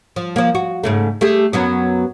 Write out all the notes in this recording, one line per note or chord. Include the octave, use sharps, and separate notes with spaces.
F3
F3 A#3
F#4
G#2 C#3 A3
A3 G4 G#4
F#2 F#3 B3